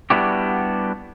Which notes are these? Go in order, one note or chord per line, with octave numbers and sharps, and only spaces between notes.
G3 B3 D4 E4 F#4 G4